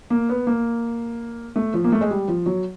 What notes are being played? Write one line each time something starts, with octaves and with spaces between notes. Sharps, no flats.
A#3
B3
A#3
A3
F3
A#3
A3
G#3
G3
F3
F#3